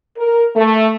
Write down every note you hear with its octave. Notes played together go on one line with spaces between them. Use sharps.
A#4
A3